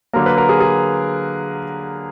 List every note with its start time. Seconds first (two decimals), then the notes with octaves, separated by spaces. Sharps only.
0.14 D3 F#3 A#3 A#4
0.26 B4
0.38 A#4
0.49 G#4
0.60 G#4